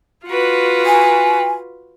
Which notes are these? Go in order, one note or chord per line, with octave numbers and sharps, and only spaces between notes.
F4 F#4 B4
G#5